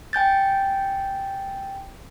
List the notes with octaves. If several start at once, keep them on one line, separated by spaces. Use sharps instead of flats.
G5 G#5 G6 A6